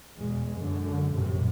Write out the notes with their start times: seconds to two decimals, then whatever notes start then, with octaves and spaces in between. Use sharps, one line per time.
0.17 E2 B2 G#3
0.53 F#2 D3
1.13 A#1 F#2 A2 C3